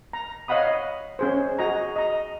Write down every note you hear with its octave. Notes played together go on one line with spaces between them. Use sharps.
A#5
C#5 D#5 F5 F#5 B5 D#6
C#4 G#4 C5
F#4 G#4 D#5 A#5
D#5 A#5